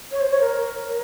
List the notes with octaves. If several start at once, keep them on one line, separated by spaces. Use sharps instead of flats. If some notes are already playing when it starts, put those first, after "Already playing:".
C#5
C5
C#5
A#4